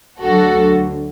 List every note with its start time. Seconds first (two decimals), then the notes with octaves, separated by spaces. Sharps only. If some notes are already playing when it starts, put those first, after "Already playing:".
0.21 D2 D3 F#3 F#4 A4